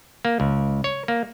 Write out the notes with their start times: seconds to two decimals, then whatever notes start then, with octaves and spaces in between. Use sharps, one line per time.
0.25 A#3
0.40 C#2
0.84 C#5
1.08 A#3